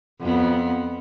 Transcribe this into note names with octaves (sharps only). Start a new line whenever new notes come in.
F2 B3